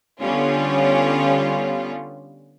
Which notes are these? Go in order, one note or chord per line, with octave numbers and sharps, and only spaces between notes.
D3 G3 B3 C#4 F4